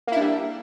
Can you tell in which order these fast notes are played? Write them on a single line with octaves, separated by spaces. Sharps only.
A#3 E4 D4 G3